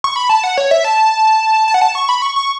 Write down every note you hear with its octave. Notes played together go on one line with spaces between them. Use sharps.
C#6
B5
A5
F#5
C#5
E5
A5
A5
F#5
A5
C#6
B5
C#6
C#6